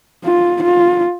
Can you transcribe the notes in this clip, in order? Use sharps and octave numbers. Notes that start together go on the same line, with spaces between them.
F4
F4